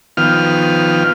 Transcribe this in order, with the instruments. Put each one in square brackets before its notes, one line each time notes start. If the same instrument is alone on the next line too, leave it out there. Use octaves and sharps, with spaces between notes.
[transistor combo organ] D#3 F3 B3 F5 G5 F6